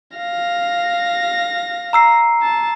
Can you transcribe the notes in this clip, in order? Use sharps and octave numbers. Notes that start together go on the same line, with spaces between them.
F5 A#6
A#5 E6 C7
A5